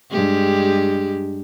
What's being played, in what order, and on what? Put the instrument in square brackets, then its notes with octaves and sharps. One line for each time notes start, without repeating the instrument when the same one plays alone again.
[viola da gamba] G2 G#3 G4